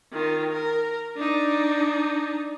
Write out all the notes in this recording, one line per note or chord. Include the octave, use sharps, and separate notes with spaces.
D#3 F4
A#4
D4 D#4